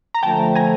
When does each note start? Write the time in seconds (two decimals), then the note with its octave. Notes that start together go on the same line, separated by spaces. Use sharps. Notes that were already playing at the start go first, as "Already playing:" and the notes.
0.14 A#5
0.23 D3 F3 A3 G5 A5
0.55 G#5 A#5